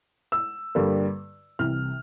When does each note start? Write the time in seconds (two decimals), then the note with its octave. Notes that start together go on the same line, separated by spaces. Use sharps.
0.32 E6
0.75 G2 D3 G3 A#3
1.59 C2 C3 E3 F6